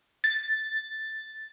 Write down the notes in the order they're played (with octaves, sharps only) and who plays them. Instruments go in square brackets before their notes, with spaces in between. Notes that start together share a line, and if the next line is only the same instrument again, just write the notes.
[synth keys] A6